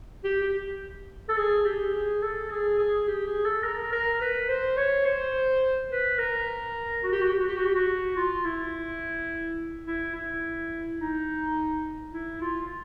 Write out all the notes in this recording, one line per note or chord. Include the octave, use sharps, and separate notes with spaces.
G4
G4
A4
G#4
G4
G#4
A4
G#4
G#4
G4
G#4
A4
A#4
A#4
B4
C5
C#5
C5
B4
A#4
F#4
G4
F#4
G4
F#4
G4
F#4
G4
F#4
F4
E4
E4
E4
D#4
E4
F4